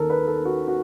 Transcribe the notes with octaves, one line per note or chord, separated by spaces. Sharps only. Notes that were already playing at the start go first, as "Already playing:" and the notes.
Already playing: D#2 D#3 A4 A#4
B4
A4
F#4
F#4